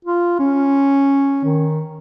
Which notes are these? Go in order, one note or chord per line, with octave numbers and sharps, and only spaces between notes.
F4
C#4
D#3